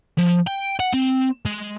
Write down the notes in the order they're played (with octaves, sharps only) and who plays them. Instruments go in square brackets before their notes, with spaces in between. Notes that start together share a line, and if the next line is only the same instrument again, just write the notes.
[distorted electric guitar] F3
G5
F#5
C4
G#3